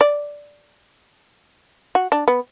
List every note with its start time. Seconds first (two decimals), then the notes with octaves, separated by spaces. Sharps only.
0.01 D5
1.95 F#4
2.12 D4
2.28 B3